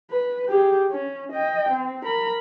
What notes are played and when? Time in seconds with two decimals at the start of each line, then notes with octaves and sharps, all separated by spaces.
0.11 B4
0.49 G4 G#4
0.91 C#4
1.33 D#5 G5
1.70 C4
2.04 A#4 B5